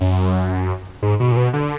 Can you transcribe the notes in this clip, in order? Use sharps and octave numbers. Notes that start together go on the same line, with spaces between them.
F#2
G#2
B2
A#2
B2
D3